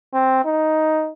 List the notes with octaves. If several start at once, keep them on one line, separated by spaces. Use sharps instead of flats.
C4
D#4